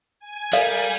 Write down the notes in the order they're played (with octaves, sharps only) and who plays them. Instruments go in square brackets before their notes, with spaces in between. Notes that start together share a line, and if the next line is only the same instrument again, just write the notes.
[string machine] G#5
[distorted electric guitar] G3 [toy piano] A4 D5 F5 [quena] A#4